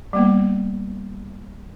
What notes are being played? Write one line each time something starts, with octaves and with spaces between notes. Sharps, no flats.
G3 A#3 B3